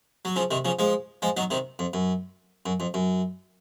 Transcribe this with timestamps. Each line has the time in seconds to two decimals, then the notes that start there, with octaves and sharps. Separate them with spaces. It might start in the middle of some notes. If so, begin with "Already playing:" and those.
0.25 F#3
0.36 C#3 F3
0.51 C3 D#3
0.65 C#3 F3
0.79 F3 G#3
1.22 F3 G#3
1.37 D#3 F#3
1.50 C3 D#3
1.79 F2
1.94 F#2
2.66 F#2
2.80 F2
2.94 F#2